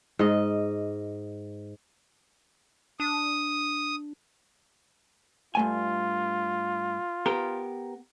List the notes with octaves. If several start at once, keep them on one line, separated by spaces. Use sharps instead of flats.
G#2 D#5
D4 D#6
G2 A3 F4 G#5
B3 G4 A#4